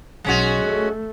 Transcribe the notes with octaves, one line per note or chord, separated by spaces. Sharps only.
B1 G#3 C#4 F#4
A3